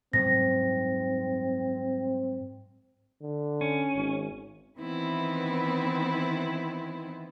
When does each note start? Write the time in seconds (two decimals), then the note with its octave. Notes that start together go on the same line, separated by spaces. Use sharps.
0.13 G#2 F#3 G3 C4 A#6
3.22 D3
3.61 C#4
3.95 G#1
4.79 D#3 E3 B3 C4 E4 B4